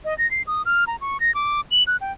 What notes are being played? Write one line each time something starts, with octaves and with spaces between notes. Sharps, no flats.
D#5
A#6
C7
D#6
F6
A#5
C#6
A#6
D6
F#7
F#6
G5